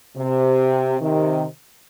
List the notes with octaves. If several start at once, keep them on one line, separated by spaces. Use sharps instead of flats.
C3
C3 D#3